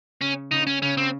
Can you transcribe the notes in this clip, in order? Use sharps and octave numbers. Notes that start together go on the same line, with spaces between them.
C#3 C#4
C#3 D#4
C#4
C#3 C#4
C4